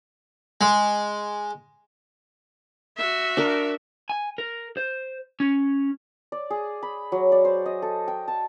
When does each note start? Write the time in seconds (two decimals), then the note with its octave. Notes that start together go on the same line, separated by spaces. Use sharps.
0.61 G#3
2.97 F#4 E5
3.37 D4 A#4
4.09 G#5
4.38 A#4
4.77 C5
5.40 C#4
6.32 D5
6.50 G#4
6.83 B5
7.12 F#3
7.32 D5
7.45 C5
7.66 D#5
7.82 A4
8.08 G5
8.28 A5